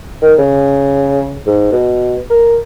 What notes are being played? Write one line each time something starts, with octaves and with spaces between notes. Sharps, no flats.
D#3
C#3
G#2
B2
A#4